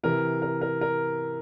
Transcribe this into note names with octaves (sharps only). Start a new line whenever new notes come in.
C3 E3 A#4
A#4
A#4
A#4